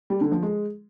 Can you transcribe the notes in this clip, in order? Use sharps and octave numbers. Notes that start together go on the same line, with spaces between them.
G3
D3
F3
G#3